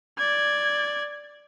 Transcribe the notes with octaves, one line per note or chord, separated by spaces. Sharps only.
D5 G#6